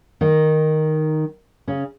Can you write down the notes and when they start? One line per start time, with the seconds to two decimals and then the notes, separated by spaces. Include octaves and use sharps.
0.21 D#3 D#4
1.68 C#3 C#4